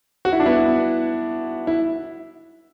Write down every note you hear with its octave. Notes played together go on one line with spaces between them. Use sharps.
F#4
E4
D4
B3 E4
E4